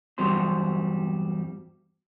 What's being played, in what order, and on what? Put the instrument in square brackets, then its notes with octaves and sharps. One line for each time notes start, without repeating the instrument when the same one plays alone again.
[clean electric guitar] E2 G2 F#3 G3 C4 C6